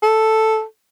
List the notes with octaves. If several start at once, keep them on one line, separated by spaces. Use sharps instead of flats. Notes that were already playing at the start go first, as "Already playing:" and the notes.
A4